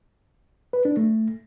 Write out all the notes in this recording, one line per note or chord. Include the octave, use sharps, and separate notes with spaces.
B4
D4
A3